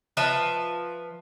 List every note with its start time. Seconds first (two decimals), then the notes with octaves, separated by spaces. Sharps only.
0.17 F3 B4 E5 A5